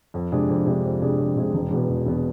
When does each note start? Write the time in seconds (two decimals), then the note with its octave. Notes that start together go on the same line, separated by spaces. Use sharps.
0.14 F2
0.32 C3 G#3 D4 G#4
0.49 F2
0.67 C3 G#3 D4 G#4
0.84 F2
1.01 C3 G#3 D4 G#4
1.18 F2
1.37 C3 G#3 D4 G#4
1.54 E1
1.71 E2 B2 B3
1.89 E1
2.06 E2 B2 B3